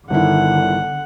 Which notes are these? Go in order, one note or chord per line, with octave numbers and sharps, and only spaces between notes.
G1 D3 D#3 E4 F#5